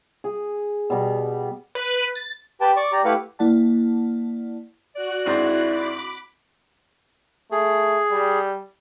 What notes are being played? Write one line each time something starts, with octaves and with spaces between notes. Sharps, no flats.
G#4
B2 G3 B3
B4
A6
G4 B4 G5 A5
D5 C#6 D6
G4 D5 A#5
A3 E4 G4 B4 F5 F#5
A#3 E4 D5 F#5 A5
F#4 D5 F#6
G#2 C4 D4 E4
B5 D6
A3 G#4
G3